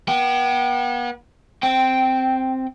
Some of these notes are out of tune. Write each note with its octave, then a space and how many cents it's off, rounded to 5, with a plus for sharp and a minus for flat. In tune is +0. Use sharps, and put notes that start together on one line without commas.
B3 -40 G5 -30
C4 +0 G5 -10